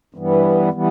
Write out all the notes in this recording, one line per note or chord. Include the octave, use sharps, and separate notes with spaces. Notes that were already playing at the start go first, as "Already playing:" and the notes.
G2 E3 G3 B3
E3 G3 B3